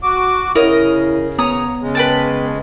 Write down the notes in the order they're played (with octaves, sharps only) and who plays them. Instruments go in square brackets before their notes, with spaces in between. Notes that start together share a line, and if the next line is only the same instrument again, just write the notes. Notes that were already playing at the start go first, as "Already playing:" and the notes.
[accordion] F#4 D6
[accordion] C#3 [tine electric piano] E4 C#5 [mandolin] A#4 D#5
[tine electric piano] B3 [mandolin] C#5 A#5 D#6
[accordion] C#3 G#3
[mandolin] B4 G5 A5